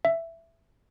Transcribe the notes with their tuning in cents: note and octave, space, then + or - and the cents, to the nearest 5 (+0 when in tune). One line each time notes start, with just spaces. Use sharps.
E5 +10